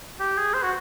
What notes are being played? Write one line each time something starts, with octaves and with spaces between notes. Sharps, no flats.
G4
G#4
C5
F#4